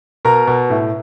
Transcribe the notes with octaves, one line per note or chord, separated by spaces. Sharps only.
B2 A#4 A#5
B2
A2